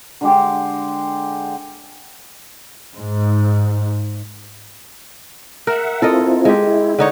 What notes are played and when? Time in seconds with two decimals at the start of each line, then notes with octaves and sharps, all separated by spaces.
0.21 D3 G#3 G4
2.98 G#2
5.67 A#4 E5 F#5
6.02 C4 E4 F4 A4 A#4 D#5
6.45 G#3 G4
6.67 E4
6.98 D3 D#4 C#5